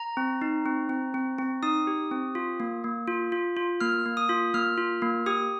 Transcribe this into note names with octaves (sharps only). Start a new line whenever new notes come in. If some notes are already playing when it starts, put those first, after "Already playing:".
Already playing: A#5
C4
D#4
C4
C4
C4
C4
D#4 D#6
G4
C4
F4
A#3
A#3
F4
F4
F4
A#3 F6
A#3
D#6
F4
A#3 F6
F4
A#3
G4 D#6